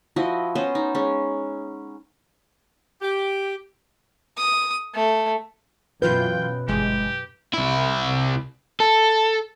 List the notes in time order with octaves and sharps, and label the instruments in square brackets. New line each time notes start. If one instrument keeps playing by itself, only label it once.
[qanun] F3 E4 F#4 D#5
B3 C#4 C5 D#5
D#4
G#3 C#4
[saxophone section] G4
[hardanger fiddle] D#6
A3
[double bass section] F#2 B2 [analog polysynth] E3 F4 G6 [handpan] B4 [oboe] G5
[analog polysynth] G1 E3 G#3 [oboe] G4
[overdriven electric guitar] C2 E4
A4